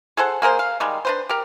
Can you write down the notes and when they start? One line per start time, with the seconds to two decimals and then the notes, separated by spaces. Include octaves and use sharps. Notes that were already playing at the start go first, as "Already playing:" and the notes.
0.17 G#4 A4 C5 F#5
0.42 A#3 G#4 A#4 C5
0.59 F5
0.80 D#3 G3 G#3
1.05 D4 B4 C5
1.29 G4 A#4